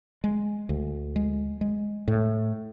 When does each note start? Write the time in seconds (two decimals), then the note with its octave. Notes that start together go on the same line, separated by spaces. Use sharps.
0.24 G#3
0.69 D2
1.16 G#3
1.61 G#3
2.08 A2